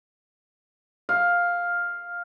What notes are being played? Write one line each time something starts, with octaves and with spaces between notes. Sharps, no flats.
F5